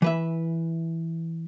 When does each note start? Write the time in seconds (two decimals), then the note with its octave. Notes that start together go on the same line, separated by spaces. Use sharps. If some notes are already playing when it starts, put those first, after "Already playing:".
0.02 E3 B4 E5